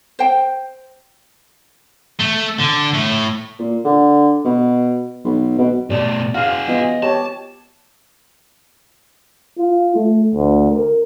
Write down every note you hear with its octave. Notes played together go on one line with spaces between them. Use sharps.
C5 G5
A3
D3
A2
A#2
D3
B2
B1
B2
B2 A3 G4 D5
F#4 G#4 F5
B3 F4 D#5
G4 C#5 A5
F4
A3
D2
A#4